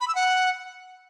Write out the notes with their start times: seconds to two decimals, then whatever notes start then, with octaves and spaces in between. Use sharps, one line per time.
0.01 B5
0.08 E6
0.15 F#5